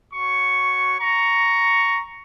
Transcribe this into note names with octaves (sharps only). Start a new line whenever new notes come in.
F#4 C#5 C#6
A#5 C#6